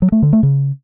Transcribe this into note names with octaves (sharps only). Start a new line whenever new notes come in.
F#3
A3
D3
A3
C#3